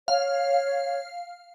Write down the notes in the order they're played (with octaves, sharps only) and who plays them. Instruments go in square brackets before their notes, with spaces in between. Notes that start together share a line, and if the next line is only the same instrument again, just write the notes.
[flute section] C#5 [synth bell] F5